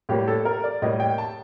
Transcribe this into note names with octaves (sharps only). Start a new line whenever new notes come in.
A2 G3 A#3 G4
A4
A#4
D5
A2 G3 A#3 D#5
G5
A5